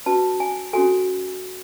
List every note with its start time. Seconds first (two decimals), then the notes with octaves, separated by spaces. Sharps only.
0.06 C#4 F#4 B4 A5
0.40 G#5
0.73 C#4 F#4 A4 G#5